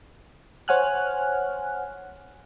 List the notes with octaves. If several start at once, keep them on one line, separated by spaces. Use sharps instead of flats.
C5 C#5 F#5 G#5 F6 F#6